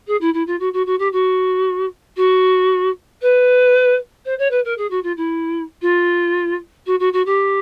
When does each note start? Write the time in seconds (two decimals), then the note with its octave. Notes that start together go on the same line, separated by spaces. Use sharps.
0.07 G#4
0.21 E4
0.34 E4
0.47 F4
0.60 F#4
0.73 F#4
0.86 F#4
0.99 G4
1.13 F#4
2.17 F#4
3.22 B4
4.25 C5
4.39 C#5
4.51 B4
4.65 A#4
4.78 G#4
4.90 F#4
5.03 F4
5.17 E4
5.82 F4
6.86 F#4
7.00 F#4
7.13 F#4
7.26 G4